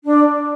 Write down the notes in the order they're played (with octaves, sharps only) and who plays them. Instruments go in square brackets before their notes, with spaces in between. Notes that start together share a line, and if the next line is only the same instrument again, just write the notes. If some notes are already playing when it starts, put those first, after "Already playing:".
[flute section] D4